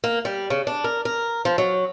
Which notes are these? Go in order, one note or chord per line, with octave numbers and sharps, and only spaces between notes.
A#3
G3
C#3
D4
A#4
A#4
F3
F#3